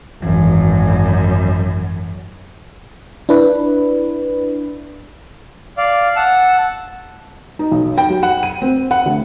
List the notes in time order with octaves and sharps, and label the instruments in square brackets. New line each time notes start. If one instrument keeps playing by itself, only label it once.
[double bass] G#1 [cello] F#2 [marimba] E3
[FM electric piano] D4 E4 B4
[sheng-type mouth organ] D5 F5
F#5 A5 E6
[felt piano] D#4
B1
G5
F#3
F#5
D#7
C4
F#5
D2